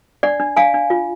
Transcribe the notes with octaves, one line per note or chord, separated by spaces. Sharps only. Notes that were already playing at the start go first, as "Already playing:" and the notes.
D4 D5 F#5
D4
D4 F5 G#5
D4
F4